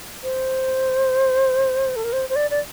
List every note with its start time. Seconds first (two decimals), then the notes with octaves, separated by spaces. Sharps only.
0.23 C5
1.96 A4
2.04 A#4
2.13 C5
2.29 C5
2.36 D5
2.51 D5